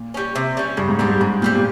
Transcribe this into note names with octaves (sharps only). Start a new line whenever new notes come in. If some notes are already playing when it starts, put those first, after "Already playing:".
Already playing: A#2
G3 C#4
C3
G3 C#4
G2 C#3
G#2
G#2 G3 C4 G4
G2
G#2 C#3
A#2 G3 C4 G4
A#2